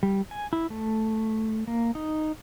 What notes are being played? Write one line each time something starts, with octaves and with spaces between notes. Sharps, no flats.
G3
G#5
E4
A3
A#3
D#4